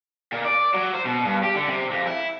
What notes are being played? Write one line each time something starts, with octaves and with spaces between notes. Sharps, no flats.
A#2
D5
F#3
C5
B2
G2
G4
D3
C3
F2
E4